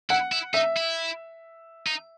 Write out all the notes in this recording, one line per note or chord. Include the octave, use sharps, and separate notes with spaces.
E4 F#5
E4
D#4 E5
E4
D#4